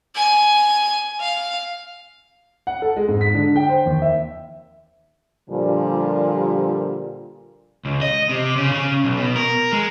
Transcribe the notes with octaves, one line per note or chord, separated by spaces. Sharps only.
G#5
F5
F#5
A4
G#3
G#2
B6
D3
G5
C5
D#2
E5
A#2 D3 F3 G3
C#2
D#5
C3
C#3
C#3
B1
B2
A#4
G#3